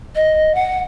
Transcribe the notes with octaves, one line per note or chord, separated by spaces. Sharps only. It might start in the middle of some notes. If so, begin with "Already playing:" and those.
D#5
F#5